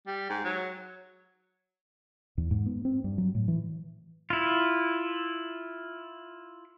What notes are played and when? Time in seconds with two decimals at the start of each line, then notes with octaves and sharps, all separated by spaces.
0.07 G3
0.29 G#2
0.44 F#3
2.38 E2
2.51 G#2
2.66 B3
2.85 C4
3.04 G2
3.18 F#3
3.35 A2
3.48 E3
4.30 E4 F4